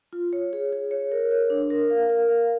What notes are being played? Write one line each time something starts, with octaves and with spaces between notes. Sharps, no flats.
F4
C#5
G#4
G#4
C#5
A#4
C#5
D4
A#4
F5
A#4
F5